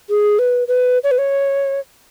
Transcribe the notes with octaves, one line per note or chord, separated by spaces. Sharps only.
G#4
B4
B4
C#5
B4
C#5